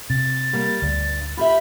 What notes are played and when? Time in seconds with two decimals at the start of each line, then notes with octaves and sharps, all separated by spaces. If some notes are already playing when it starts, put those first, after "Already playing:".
0.10 C3 A6
0.53 G3 A#3
0.82 D2 G2
1.37 F4 G4 E5 B5